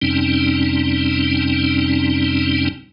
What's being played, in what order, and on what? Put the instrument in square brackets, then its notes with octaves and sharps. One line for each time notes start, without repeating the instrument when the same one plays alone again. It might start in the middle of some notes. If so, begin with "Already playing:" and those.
[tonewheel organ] F2 C3 G3 C4 C#4 D#4